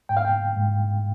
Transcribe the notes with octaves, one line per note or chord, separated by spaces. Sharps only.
G#2 G5
F5
G5
G#2